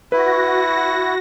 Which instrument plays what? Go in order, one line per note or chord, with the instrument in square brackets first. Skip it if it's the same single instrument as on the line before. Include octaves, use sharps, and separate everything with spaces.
[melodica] E4 [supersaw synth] F#4 A#6 [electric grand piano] B4